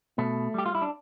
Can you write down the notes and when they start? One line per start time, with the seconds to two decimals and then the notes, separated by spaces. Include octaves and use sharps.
0.18 B2 A3
0.54 G3 G4
0.66 F4
0.75 E4
0.82 D4